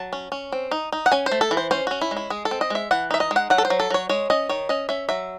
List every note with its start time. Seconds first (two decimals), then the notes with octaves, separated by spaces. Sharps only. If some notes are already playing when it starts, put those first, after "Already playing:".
Already playing: F#3 A5
0.13 C#4
0.32 C#4
0.52 C4
0.71 D#4
0.92 D#4
1.06 F#5
1.12 C#4 G#5
1.26 C5
1.31 A3
1.41 A4
1.51 E3
1.57 C5
1.71 C#4 C5
1.87 C#4 F#4
2.01 E4
2.11 G#3
2.17 E4
2.30 G#3 G#4
2.45 A4
2.51 C4
2.61 D#5
2.70 G#3 E5
2.91 E3 F#5
3.11 D#4 E5
3.20 D#5
3.31 G#3
3.36 F#5
3.50 F#3 F#5
3.58 A4
3.65 C5
3.70 F#3
3.80 A4
3.90 F#3 C#5
4.09 G#3 C#5
4.30 C#4 D#5
4.49 D#3 C#5
4.69 C#4 D#5
4.89 C#4 E5
5.09 F#3 E5